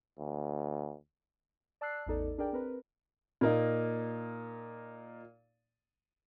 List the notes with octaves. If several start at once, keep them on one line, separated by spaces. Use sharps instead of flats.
D2
D5 A5 E6 F#6 C7
A1 E2 D#4 A4 D5
D4 G#4 A#4 D5 G5
C4 A#4 B4
A#2 A#3 D#4